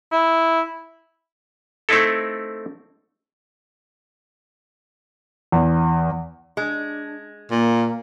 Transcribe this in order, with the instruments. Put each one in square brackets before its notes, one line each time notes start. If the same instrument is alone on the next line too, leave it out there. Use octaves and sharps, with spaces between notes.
[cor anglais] E4
[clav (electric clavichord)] A3 C4 D#4 E4 A4
[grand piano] E2
[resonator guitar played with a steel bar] G#3 [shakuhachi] D4
[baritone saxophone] A#2 [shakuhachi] A#3